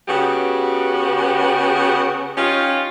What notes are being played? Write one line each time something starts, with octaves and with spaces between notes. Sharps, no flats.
C#3 B3 F#4 G4
C#4 D#4 F4 G4